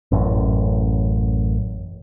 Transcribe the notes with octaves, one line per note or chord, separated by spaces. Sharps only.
A1 F#2